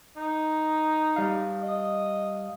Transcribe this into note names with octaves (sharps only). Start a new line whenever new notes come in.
D#4
G3 F5
D#5